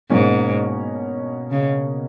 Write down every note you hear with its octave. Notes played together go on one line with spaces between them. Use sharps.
G#2 B2 A#3 C#4
C#3